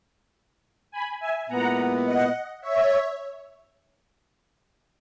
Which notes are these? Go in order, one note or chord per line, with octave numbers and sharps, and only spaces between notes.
G#5 B5
E5 G#5
A#2 G#3 B3 E4 F#5 A#5
D#5 F#5
C#5 E5